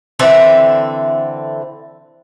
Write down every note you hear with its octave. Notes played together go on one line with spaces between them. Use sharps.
D3 E3 C4 E5